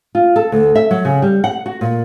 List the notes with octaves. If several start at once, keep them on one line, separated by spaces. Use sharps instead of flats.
F4
A4
D2
E5
F#3
C#3
G3
F#5
F#4
A#2